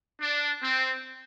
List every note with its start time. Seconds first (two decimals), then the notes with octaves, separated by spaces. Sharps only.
0.21 D4
0.63 C4